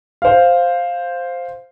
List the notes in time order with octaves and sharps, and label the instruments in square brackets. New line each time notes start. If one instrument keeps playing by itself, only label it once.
[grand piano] C5 F5